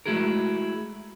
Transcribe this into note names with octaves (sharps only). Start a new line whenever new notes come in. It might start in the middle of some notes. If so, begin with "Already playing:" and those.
G#3 A3 E4 F#4 G#4 A#4